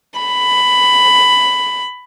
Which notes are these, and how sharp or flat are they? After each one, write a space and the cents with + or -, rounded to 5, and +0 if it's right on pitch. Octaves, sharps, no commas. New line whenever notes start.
B5 +10